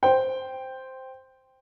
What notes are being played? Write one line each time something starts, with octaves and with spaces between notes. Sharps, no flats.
C5 G5